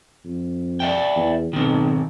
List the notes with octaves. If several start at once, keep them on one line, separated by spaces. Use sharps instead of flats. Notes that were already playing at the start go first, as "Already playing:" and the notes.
F2
D5 E5 G5
E2
B1 D#3 C4